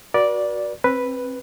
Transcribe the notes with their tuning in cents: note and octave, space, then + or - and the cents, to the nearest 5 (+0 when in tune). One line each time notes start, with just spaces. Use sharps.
F#4 +0 B4 -45 D5 -5
C4 +25 B4 +0